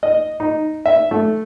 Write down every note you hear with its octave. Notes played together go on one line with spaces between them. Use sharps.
D#5
D#4
E5
A3